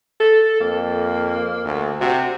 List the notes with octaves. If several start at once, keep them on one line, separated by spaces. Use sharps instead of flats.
A4
F2 A#3
D2
C3 F#4